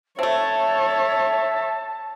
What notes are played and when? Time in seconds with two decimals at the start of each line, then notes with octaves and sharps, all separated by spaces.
0.19 A3 C4 C#5 E5 A5